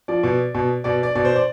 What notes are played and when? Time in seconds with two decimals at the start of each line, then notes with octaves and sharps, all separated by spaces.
0.08 F3 D5
0.23 B2
0.54 B2
0.84 B2 D5
1.03 D5
1.15 B2 D5
1.25 C5
1.36 D5